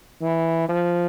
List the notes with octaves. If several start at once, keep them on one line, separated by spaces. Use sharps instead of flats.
E3
F3